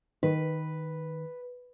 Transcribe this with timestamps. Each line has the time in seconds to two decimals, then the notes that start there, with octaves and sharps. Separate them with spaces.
0.23 D#3 B4